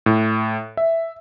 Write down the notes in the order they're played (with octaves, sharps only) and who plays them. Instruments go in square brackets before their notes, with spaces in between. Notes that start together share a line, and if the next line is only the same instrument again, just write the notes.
[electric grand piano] A2
E5